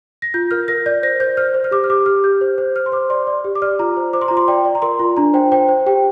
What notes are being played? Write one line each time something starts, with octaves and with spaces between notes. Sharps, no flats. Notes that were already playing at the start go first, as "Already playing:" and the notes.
A#6
F4 G6
A#4 F6
A#4 A#6
D5 G6
C5 A#6
C5 G6
C5 F6
C5
F6
G4 D6
F6
G4 D6
G4 F6
G4 G6
C5
C5
C5 F6
C6
C5 D6
D5 C6
D5
G4
D6
D5 F6
F4 A#5
C5
C5 D6
C6
F4 A#5
C6
D5 G5
D5
A#5
A#4 C6
F4
D4 A#5
C5 G5
C5 G5
C5
G4 G5